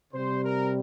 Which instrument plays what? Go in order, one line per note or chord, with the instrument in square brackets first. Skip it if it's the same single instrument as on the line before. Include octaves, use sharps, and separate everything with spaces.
[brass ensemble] C3 G3 C4 C5
A#4